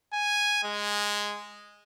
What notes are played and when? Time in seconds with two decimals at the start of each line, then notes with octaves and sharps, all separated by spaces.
0.13 G#5
0.63 G#3